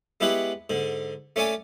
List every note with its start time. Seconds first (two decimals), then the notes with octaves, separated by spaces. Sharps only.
0.20 G#3 B3 E4 G4 C#5 F#5
0.70 G#2 D3
1.36 A3 C#4 C#5 D5 G#5